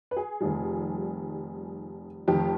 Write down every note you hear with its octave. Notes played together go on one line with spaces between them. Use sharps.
B4
G#4
F1 F2 D#3 G3
F1 F2 D#3 G4